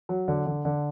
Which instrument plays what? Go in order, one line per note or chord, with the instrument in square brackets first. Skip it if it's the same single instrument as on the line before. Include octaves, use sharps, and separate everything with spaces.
[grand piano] F#3
D3
D3
D3